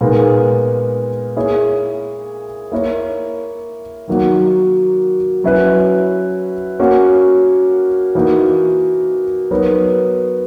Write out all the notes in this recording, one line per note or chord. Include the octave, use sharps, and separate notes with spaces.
A#2 G#3 B3 D#4 A#4
A#3 E4 G#4 C#5
A#3 E4 A#4 C#5
D#3 F#3 A#3 D#4 F#4
F#3 C#4 E4 B4
A#3 C#4 F#4 C#5
E3 A#3 D#4 F#4
F#3 B3 D#4 A#4 C#5